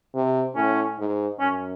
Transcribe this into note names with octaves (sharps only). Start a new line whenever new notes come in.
C3
A2 C#4
G#2
F#2 C#4